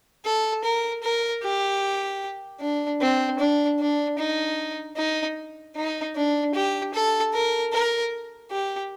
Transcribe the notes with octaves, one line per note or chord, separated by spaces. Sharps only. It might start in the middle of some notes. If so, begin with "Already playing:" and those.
A4
A#4
A#4
G4
D4
C4
D4
D4
D#4
D#4
D#4
D4
G4
A4
A#4
A#4
G4